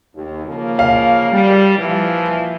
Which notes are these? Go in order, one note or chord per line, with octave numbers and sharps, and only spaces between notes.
D#2
C#3 F3 A#3
F5
G3
A#2 E3 F3